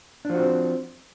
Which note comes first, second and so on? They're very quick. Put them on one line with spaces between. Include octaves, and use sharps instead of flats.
D4 F3 F#4 C4